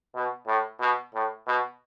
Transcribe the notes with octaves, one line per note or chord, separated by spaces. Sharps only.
B2
A2
B2
A2
B2